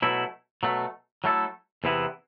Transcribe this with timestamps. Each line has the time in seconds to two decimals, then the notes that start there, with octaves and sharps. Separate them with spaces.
0.02 B2 F#3 A3 E4
0.63 B2 F#3 A3
1.24 F#3 A3 E4 A4
1.84 E2 C3 E3 B3 E4